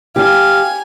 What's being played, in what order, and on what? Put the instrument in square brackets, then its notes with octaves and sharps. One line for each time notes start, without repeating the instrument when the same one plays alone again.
[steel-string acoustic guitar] G4 [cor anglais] F5 [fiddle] G#5